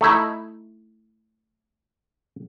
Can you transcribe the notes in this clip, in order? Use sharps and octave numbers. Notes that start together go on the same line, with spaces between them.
A3 D#4 E4